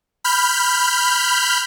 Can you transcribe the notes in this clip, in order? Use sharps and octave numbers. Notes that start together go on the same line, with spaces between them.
B5 F6 G6